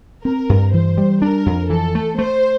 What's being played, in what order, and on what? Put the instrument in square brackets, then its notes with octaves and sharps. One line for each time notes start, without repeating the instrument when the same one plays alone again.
[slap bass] C4 [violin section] A#4
[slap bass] G2
[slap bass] E3 [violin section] C5
[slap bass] G3
[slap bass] D4 [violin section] A#4
[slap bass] F2
[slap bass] E3 [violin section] A4
[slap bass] A3
[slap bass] A3 [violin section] C5